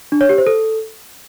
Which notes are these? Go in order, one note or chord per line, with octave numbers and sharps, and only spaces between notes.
D4
C#5
G4
C5
A4